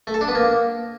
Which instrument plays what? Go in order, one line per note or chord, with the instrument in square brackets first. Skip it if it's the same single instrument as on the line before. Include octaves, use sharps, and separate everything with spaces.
[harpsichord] A3
A4
D4
B3
A#3